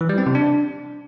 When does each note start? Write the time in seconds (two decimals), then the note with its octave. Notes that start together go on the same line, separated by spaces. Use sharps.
0.01 E3
0.09 G3
0.18 C4
0.26 C3
0.35 D4